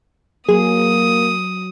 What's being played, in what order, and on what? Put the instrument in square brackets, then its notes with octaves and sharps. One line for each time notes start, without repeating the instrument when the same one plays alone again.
[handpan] F#3 [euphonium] A#3 [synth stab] G#4 [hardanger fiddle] D#6